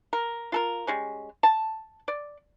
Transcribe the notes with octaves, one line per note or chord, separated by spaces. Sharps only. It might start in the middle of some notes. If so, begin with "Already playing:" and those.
A#4
F4 A4 A#4
G3 G#3 C#4
A5
D5